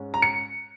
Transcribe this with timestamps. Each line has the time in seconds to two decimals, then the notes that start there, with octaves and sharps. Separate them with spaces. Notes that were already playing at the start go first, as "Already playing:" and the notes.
Already playing: G#2 G#3 C#4
0.14 A#5
0.22 C#7